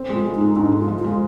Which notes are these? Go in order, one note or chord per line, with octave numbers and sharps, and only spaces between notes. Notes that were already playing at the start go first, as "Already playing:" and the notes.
Already playing: C4
G#3 F4
G#3
D#4
G#3
G#2 D4
G#3
F4
F3
F4
G#3